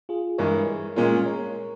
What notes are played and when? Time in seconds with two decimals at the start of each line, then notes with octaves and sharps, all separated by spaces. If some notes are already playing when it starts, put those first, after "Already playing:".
0.09 F4 G#4
0.38 G2 E3 G#3 A#4 C#5
0.96 A#2 G#3 C#4 F4 A#4 C#5
1.26 A#4 C#5